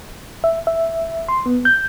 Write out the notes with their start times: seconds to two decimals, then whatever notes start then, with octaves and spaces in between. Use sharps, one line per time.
0.44 E5
0.67 E5
1.29 C6
1.46 B3
1.65 G6